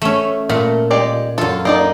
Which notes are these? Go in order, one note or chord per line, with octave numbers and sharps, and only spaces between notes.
A3 C#4
A#2 A3
G#3 G4 D5
F#2 F4 A4
A#3 D#4 D5